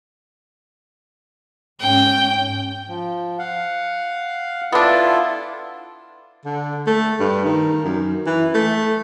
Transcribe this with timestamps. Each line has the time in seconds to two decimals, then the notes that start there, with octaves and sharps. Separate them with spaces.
1.80 G#2 C#4 G5
2.88 F3
3.39 F5 F#5
4.72 B3 D4 E4 F4 A4
6.45 D3
6.87 A3
7.20 G2
7.45 D#3
7.85 F#2
8.27 E3
8.55 A3